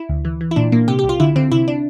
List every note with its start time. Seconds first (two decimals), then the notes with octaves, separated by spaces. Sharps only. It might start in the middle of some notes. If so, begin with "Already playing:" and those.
Already playing: E4
0.09 D2
0.25 E3
0.41 E3
0.51 E4
0.56 A#2 D4
0.72 A#2 A#3
0.88 C3 G4
0.99 G4
1.04 C2
1.09 F4
1.20 D3 E4
1.36 D3 C4
1.51 C3 E4
1.68 D4